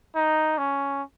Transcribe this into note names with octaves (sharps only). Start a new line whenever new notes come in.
D#4
C#4